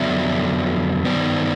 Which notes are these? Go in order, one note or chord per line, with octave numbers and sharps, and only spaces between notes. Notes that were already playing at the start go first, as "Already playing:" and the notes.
Already playing: F2 D3 F#3 B3 D5 E5
G2 D#3 G#3 B3 C5 D5